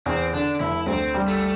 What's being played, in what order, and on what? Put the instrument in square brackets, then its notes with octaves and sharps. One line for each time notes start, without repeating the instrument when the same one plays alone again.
[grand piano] E2 [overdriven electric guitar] C4
[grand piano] D3 [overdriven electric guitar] D4
[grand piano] F1 [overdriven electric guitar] E4
[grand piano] D2 [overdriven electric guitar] C4
[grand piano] G3
[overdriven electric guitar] A3